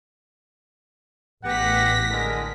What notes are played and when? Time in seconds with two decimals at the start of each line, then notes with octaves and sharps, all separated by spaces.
1.44 A1 B3 G4 F#5 A#6 B6
2.09 D3 G#3 A#4